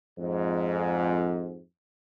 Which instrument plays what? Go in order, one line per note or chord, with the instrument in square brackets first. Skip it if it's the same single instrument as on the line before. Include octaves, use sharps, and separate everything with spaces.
[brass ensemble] F2 G#2